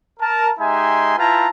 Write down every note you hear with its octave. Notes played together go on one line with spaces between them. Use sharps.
A#4 A5
G#3 D#4 G4 E5 G#5 C6
E4 F4 B4 G5 A5 A#5